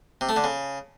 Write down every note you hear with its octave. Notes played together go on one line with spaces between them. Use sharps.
C3
A3
D3
C#3